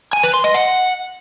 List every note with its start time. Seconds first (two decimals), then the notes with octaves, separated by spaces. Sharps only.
0.13 G#5
0.23 B4
0.34 C6
0.44 D#5
0.54 F#5